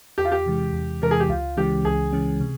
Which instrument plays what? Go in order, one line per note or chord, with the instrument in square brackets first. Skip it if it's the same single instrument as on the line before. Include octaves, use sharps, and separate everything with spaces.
[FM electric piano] E2 [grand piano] G4
[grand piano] F4
G4
[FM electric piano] C3 E3 G#3
E2
[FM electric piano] C3 E3 G#3 [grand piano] A#4
[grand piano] G#4
G4
[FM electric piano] C#2 [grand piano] F4
[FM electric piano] C#3 E3 G#3 C#4 [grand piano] G4
[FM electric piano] C#2 [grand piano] G#4
[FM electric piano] C#3 E3 G#3 C#4
C3